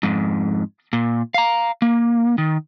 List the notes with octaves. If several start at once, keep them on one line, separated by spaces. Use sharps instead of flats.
F2 G#2
A#2
F5 A#5
A#3
D#3